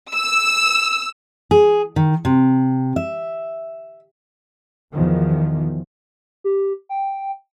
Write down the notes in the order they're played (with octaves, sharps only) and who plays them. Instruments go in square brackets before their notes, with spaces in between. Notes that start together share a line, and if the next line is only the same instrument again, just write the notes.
[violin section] E6
[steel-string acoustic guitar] G#4
D#3
C3
E5
[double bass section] E2 B2 D#3 F3
[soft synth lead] G4
G5